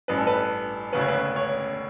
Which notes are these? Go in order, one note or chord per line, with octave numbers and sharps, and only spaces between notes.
A1 G2 E3 B4
A4
B4
E1 D2 C#3 B4
C#5
B4
C#5